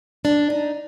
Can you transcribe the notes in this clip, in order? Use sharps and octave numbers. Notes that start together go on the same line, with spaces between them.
D4
D#4